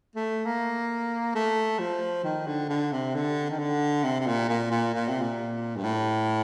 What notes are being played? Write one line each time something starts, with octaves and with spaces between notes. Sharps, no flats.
A3
A#3
A3
F3
D#3
D3
D3
C3
D3
D#3
D3
C3
C3
A#2
A#2
A#2
A#2
C3
A#2
G2
A2